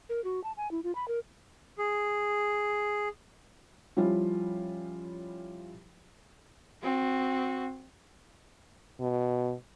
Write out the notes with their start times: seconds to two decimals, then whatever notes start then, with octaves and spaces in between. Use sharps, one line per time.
0.09 A#4
0.24 F#4
0.44 A5
0.57 G#5
0.71 E4
0.84 F4
0.95 B5
1.08 A#4
1.78 G#4
3.97 F3 G3 C#4 E4 F4
6.83 C4 F#4
9.00 B2